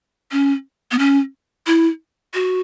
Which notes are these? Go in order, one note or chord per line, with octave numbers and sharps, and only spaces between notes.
C#4
B3
C#4
E4
F#4